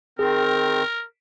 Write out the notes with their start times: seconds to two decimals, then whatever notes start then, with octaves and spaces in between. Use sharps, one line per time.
0.19 D#3 C4 G#4 A#4